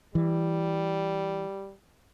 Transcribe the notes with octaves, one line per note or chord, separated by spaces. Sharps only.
E3 G3